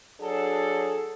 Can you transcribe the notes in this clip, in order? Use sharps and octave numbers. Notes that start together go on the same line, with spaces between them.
F#3 D4 G#4 A4